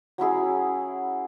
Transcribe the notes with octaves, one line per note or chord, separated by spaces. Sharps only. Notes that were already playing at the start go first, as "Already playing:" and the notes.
F#3 C#4 E4 G#4